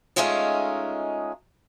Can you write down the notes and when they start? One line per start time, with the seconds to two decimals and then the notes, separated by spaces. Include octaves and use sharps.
0.16 G#3 A3 C#4 D#4 F4 G#4